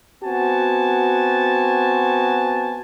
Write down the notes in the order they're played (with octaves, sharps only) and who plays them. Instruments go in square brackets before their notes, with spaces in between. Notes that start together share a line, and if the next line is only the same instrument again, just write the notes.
[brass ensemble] B3 C4 F#4 G#5 A5